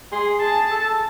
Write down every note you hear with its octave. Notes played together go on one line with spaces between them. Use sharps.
G#4 C6
G#4 A5
A4